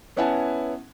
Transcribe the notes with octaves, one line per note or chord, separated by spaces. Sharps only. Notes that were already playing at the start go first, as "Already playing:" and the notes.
B3 C#4 E4 F#5 G#5 A5